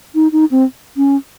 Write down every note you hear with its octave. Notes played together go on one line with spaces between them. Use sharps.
D#4
D#4
C4
C#4